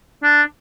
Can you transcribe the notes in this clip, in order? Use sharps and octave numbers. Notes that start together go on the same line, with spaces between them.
D4